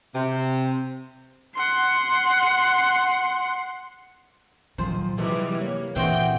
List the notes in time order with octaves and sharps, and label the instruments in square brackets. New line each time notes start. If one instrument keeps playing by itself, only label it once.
[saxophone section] C3
[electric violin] F#5 C6
[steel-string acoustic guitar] A#2 D#3 F3 [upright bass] F#3 [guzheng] C5
[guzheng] C3 [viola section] E3 G3 G#3 [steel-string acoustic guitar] F3
[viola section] A#3 [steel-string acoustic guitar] C#5
[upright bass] A#2 [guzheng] E3 C4 F#4 [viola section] A#3 G#4 G5